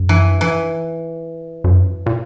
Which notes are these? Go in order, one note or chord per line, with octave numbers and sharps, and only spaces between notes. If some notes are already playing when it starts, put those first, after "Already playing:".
Already playing: F#2
E3
E3
F#2
A#2